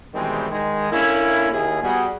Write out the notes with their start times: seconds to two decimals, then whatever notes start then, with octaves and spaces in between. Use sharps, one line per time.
0.14 B2 D#3 E3 G3 G#3 C4
0.52 D#3 G#3
0.92 D3 A#3 C#4 E4
1.53 D#2 E4 G#4
1.83 G3 B3 F#4 G#4